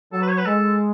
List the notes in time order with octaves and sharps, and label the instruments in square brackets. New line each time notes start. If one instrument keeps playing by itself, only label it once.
[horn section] F#3 [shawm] A4
[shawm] B4
C#5
B4
[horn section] G#3 [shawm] A4